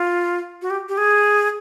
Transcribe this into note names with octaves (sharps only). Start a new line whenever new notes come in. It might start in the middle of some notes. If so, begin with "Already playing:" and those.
Already playing: F4
F#4
G4
G4
G#4